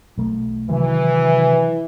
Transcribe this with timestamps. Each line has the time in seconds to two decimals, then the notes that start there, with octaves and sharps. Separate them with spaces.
0.17 B1 A3
0.70 C3 D#3 E3 F#3